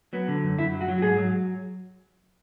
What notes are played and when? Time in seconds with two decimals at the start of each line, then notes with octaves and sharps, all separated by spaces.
0.13 F#3 B3
0.28 D3
0.44 F#2
0.58 F#2 E4
0.73 F#3
0.81 F#4
0.88 F#3
0.98 F#4
1.02 G#2 G#4
1.17 F#3